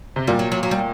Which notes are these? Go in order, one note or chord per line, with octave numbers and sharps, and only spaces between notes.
C3
A#2 G3
F#3
F#3
F#3
G3